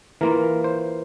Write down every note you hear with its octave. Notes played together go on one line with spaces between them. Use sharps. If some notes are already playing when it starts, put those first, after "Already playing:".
E3 A#3 F4 A#4
C5